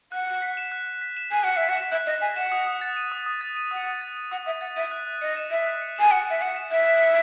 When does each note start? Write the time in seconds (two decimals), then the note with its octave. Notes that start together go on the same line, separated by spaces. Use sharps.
0.12 F#5 F#6
0.27 F#6
0.42 B6
0.57 E7
0.72 F#6
0.87 F#6
1.01 B6
1.17 E7
1.32 G#5 F#6
1.44 F#5 F#6
1.57 E5 B6
1.69 F#5
1.77 E7
1.91 E5 F#6
2.06 D#5 F#6
2.21 G#5 B6
2.36 F#5 E7
2.52 D#6
2.67 D#6
2.81 A6
2.97 D#7
3.12 D#6
3.26 D#6
3.41 A6
3.56 D#7
3.71 F#5 D#6
3.86 D#6
4.02 A6
4.17 D#7
4.31 F#5 D#6
4.46 E5 D#6
4.61 F#5 A6
4.76 E5 D#7
4.91 F#6
5.07 F#6
5.21 D#5 C#7
5.36 E7
5.51 E5 F#6
5.66 F#6
5.81 C#7
5.96 G#5 E7
6.11 F#5 F#6
6.26 E5 F#6
6.41 F#5 C#7
6.56 E7
6.71 E5 F#6
6.86 F#6
7.01 C#7